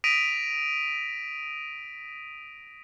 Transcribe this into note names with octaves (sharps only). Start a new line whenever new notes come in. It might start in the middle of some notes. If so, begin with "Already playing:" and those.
D#6 A#6 B6 D7 D#7 F7